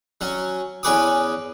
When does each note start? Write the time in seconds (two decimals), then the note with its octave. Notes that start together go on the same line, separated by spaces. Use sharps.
0.21 F#3 C#4
0.83 E2 C#4 G#4 B4 D6 D#6